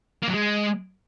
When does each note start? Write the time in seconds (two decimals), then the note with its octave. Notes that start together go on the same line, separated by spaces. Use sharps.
0.23 A#3
0.28 F#3
0.34 G#3